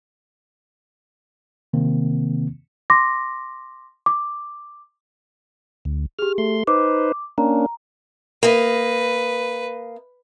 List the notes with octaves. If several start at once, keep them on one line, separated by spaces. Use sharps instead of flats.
C3 D#3 A#3 C4
C6 D6 A#6
D6
D2
G4 G#4 F6
A3 C6
D#4 B4 C5 D6
A#3 C#4 D4 A#5
A#3 B4 D#5